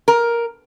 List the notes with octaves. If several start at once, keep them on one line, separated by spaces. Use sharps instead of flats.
A#4